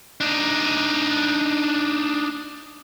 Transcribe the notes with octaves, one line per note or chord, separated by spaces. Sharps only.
D4 D#4